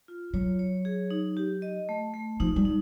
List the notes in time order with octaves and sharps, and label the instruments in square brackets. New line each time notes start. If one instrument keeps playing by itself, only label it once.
[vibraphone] F4
[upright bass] F#3 [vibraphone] C#5
[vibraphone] C#5
G#4
D#4
G4
D#5
A3
A3
[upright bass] F3 [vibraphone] D#4
[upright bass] G3
[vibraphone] D#4